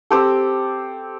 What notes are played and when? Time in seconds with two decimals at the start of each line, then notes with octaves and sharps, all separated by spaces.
0.11 C4 G4 A4